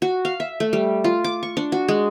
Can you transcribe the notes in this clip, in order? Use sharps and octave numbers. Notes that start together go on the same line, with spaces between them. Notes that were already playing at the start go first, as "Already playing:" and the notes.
F#4
F5
E5
A3
G3
F4
D6
C#6
D4
F#4
G#3